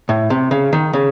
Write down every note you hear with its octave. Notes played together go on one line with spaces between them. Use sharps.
A2
C3
C#3
D#3
C#3